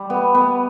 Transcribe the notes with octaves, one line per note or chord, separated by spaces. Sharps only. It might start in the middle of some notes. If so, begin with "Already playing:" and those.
Already playing: G3
B3
B3